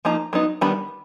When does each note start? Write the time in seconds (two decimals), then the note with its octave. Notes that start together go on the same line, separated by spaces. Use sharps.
0.05 F3 A#3 D#4 A#5
0.33 F#3 B3 D#4
0.61 D#3 G3 B3 D4 B5